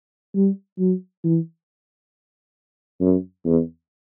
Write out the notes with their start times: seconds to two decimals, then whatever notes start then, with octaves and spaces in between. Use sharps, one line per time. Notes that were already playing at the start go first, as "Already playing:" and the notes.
0.35 G3
0.79 F#3
1.24 E3
3.01 F#2
3.45 E2